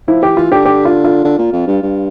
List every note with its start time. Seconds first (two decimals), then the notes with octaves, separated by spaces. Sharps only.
0.08 F3 E4
0.23 E3 G4
0.37 E3 F4
0.51 D3 G4
0.66 G4
0.85 F4
1.04 F4
1.25 D3
1.38 A#2
1.53 F2
1.67 G2
1.83 G2